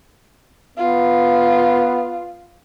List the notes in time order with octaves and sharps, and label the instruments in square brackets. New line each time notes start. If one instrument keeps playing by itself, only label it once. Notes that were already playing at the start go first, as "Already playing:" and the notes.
[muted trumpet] B3 [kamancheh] F4